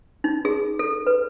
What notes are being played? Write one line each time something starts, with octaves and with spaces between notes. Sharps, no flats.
D#4
G#4
A4
B4